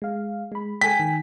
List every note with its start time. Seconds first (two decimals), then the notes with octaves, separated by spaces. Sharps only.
0.02 G#3 F5
0.52 G#3 B5
0.81 G#3 A4 G5 G#5 B6
0.99 D#3